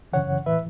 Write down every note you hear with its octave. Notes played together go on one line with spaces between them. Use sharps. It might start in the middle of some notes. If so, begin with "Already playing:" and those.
F#2 C#3 E3 C#5 F#5
A2 E3 B4 E5